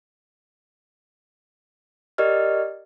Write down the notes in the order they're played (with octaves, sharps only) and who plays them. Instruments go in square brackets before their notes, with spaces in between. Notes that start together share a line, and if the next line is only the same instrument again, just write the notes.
[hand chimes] G4 A#4 D5 D#5 F6